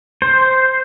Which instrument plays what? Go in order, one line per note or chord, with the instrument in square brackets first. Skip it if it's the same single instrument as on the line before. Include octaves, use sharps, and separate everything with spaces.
[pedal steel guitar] C5